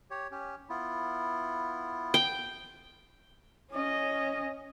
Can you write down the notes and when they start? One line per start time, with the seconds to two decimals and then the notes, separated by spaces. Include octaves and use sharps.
0.10 G4 C#5
0.31 C#4 G4
0.69 B3 E4 F4
2.14 G5
3.71 C#4 D#5